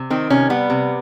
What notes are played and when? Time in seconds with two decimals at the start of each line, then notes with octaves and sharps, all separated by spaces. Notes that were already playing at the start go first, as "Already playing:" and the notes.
Already playing: C3
0.10 D#3 C4
0.30 C3 C#4
0.50 G3 B3
0.70 C3